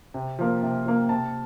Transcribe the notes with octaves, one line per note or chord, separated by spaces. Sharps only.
C3
F3 A#3
C3
F3 A#3
C3 A5